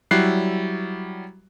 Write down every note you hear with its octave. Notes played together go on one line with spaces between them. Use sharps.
F#3 G3 E4 F#6 C7